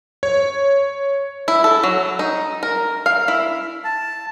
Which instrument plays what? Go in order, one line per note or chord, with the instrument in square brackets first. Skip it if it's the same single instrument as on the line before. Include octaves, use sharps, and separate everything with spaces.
[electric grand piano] C#5
[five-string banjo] E4
A4
F#3
D#4
A#4
F5
E4
[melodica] A5